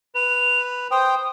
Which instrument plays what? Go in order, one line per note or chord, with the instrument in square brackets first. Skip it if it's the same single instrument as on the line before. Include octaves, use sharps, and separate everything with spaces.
[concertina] B4 [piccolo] F7
[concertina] C5 G5 [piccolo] D#6